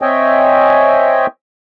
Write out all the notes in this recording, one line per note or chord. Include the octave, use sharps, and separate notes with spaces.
C4 C#5 D#5 E5 G5 G#5